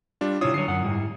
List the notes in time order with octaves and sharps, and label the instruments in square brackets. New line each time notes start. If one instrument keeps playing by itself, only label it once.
[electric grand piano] G3 D4 F4
[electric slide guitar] C3 E4 F4 [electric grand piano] C#5 D#6
[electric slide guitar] D3 F#3 C#5 [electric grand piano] C7
[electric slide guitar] F#2 F#5
G#2 G3 E4